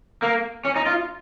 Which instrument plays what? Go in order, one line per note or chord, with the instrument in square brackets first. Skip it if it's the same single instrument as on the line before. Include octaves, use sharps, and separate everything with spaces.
[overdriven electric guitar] A#3
C#4
D#4
F4